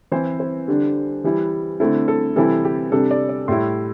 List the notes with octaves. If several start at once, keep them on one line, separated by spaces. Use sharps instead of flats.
E3 C4 E4 C5
C5
D3 G3 D4
E3 G3 E4
D3 A3 C4 E4 A4
A4
C3 E3 G3 C4 E4 A4
G4
C3 G3 D4 A4
D5
D5
A2 G3 E4 C6